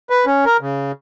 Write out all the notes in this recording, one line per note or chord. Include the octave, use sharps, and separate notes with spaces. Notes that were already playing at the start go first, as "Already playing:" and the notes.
B4
C#4
A#4
C#3